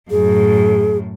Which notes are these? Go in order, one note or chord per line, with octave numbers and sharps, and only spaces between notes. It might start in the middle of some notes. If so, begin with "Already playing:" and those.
F#2 A2 G#4